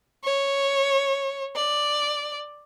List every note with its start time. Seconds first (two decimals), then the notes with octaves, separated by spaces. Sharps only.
0.24 C#5
1.55 D5